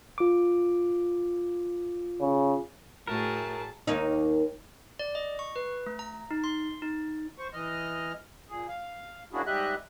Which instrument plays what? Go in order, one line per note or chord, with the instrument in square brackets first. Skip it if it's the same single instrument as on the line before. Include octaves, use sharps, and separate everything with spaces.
[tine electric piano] F4 D6
[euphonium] C#3
[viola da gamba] A2 F#4 G#4 [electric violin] A3 A5 [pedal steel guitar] A#4
[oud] D#2 A#3 D#4
[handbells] D5
D#5
C#6
B4
A3
A#5
D#4
C6
D#4
[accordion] C5 C#6
E3 D#5 F6
A#2 G#4
F5
A#3 C#4 D4 E4 F#4 G#4
G#2 G3 G4 D#5 E5 F#6